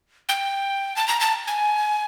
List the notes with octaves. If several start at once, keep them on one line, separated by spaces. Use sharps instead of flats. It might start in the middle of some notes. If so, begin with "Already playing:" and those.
G5
A5
A#5
A5
G#5